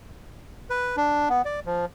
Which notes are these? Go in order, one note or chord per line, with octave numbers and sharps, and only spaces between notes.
B4
D4
B3
D5
F3